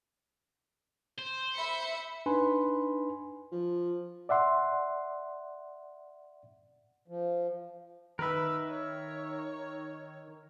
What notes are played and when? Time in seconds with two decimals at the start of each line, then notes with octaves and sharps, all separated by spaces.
1.19 C5
1.54 E5 B5 C#7
2.26 D4 D#4 B4 G#5 B5 C6
3.52 F3
4.29 D5 E5 F#5 C6
7.08 F3
8.19 D#3 A#4 B4 E5
8.68 C#5